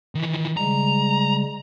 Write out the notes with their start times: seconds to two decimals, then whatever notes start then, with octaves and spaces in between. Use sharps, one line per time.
0.15 D#3 E3
0.57 C#3 G3 G#3 A#5